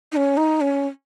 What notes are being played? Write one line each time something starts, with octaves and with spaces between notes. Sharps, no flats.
D#4
C#4
D#4
C#4